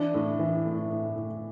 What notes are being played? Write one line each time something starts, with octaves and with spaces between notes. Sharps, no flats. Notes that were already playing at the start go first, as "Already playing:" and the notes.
Already playing: E3 D4
A2
E3
A2
A2
A2